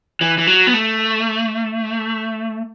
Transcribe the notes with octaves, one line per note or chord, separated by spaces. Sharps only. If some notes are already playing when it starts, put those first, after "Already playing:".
E3
E3
F#3
B3
A3